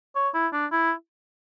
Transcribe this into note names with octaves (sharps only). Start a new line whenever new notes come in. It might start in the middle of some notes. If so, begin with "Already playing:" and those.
C#5
E4
D4
E4